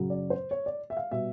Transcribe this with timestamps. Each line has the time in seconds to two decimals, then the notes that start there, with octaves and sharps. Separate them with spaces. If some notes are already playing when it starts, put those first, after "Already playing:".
Already playing: F#2 C#3 F#3
0.10 D5
0.30 C5
0.51 C#5
0.66 D5
0.90 E5
0.97 F5
1.11 B2 G3 B3 E5